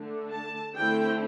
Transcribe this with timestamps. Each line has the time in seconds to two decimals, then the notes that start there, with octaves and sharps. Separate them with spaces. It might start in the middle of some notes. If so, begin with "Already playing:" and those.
Already playing: D3 A3 D4
0.30 A5
0.74 D3 A3 C4 E4 G5